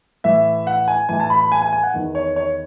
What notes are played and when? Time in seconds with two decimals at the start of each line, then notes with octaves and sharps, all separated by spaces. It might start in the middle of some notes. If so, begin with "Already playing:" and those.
0.24 A2 E3 E5
0.67 F#5
0.88 G#5
1.09 A2 E3 G#5
1.20 A5
1.30 B5
1.41 B5
1.52 G#5
1.62 G#5
1.73 G#5
1.83 F#5
1.94 E2 D#3
2.15 C#5
2.36 C#5